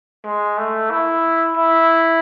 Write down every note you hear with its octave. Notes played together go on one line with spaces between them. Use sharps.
G#3
A3
E4
E4